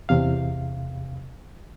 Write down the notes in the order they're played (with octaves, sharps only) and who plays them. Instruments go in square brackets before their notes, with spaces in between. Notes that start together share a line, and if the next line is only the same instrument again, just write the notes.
[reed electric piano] E2 C3 F5